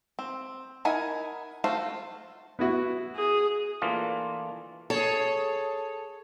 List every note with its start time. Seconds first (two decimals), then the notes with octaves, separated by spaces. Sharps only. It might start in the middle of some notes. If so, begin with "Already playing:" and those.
0.19 C4
0.85 D#4 E4 A#4 F#5 G#5
1.64 A3 F4 F#4 C5
2.59 B3 E4 F#4
3.16 G#4
3.82 E3 A3 A#3 D4 F4
4.90 G#4 A4 C#5